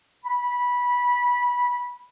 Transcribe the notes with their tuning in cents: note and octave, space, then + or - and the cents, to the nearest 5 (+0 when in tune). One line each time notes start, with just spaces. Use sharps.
B5 -15